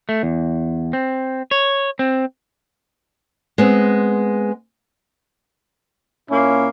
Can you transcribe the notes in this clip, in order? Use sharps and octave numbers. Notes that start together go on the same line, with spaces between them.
A3
E2
C4
C#5
C4
G#3 B3 C4
A#2 A#3 C#4 E4